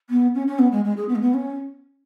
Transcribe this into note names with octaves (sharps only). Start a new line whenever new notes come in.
B3
C#4
C#4
B3
G#3
G#3
G#4
B3
G#3
B3
C#4